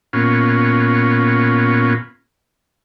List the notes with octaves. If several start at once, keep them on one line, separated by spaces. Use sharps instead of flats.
A#2 B3 C#4 F4